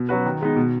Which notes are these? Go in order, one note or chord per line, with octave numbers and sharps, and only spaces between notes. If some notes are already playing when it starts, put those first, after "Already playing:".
Already playing: B2
F#3 C#4 F#4 B4
D#3
G#3 B3 D#4
B2